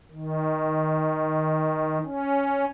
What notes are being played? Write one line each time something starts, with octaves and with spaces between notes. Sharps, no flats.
D#3
C#4